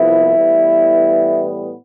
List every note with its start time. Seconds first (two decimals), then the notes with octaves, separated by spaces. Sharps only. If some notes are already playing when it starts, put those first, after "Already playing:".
Already playing: C2 C3 F3 B3 E4
0.36 A2 E3 G3 B3